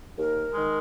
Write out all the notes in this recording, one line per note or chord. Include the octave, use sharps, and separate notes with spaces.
D#2 A#4
D#3 G#3